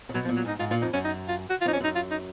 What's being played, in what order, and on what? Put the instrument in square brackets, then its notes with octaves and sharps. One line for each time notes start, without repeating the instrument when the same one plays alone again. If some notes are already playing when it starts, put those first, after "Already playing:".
[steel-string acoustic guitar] C#3
[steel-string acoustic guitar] B2 [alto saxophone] F#3
[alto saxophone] F3
[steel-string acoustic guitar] A#2
[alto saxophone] F#3
[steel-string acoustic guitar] G#2 [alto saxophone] D#4
[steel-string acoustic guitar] G#2 [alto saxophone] F4
[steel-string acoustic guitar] A#2 [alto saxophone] F4
[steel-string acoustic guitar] F2 [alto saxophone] D#4
[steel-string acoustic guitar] F#2 [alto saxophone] C#4
[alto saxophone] D#4
F4
F#4
F4
[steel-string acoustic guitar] F2 [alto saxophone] D#4
[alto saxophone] C#4
[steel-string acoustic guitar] F#2 [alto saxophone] D#4
[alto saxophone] F4
D#4